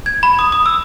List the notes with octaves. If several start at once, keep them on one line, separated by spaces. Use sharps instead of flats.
G#6
B5
D#6
D#6
E6